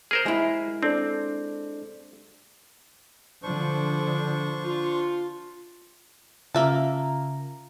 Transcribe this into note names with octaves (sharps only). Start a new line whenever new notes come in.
G#4 A#4 C5 F6
G#3 E4
C4 D4 A4 D5
D3 F3 D4 C5 C#6
F4
C#3 A#3 F4 E5 A5 A#5